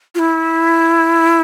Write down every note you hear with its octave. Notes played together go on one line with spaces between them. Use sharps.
F4
E4